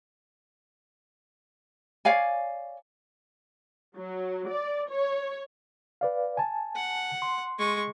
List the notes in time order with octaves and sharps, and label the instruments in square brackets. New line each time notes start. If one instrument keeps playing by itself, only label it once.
[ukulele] C#5 D5 F5 G#5
[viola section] F#3
D5
C#5
[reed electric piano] B4 D5 F5
G#5 A5
[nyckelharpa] F#5
[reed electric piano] C6
[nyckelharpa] G#3 C#6